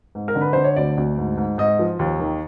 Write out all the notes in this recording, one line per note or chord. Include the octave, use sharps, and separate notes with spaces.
G#2
A#4
D3
B4
D3 C5
C#5
D2 D5
D2
G#2
G#2
G#2 D#5
F3
D#2
D#3